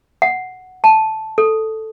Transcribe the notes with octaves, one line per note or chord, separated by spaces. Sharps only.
F#5
A5
A4